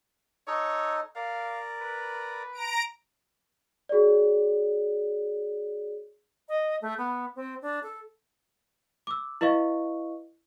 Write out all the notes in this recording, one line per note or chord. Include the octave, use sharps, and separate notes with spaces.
D#4 A4 C#5 D#5
A#4 D5 F5
B4
A#5 D7
F#4 G#4 C#5 D5
D#5
A3
B3
C4
D4
A4
D6 E6
E4 B4 D#5 F5 C#6